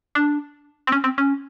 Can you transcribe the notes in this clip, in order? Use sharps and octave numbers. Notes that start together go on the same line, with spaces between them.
D4
C4
C#4
C4
C#4